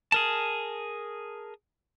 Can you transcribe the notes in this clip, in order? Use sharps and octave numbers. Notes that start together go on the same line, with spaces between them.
G#4 A#4 A5